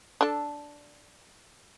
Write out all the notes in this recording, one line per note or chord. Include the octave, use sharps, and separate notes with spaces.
D4 A4